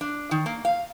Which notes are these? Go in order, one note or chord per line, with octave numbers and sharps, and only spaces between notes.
D4
D#3
A#3
F5